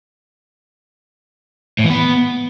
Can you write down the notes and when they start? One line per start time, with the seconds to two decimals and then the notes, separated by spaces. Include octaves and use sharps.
1.79 A2
1.84 E3
1.90 B3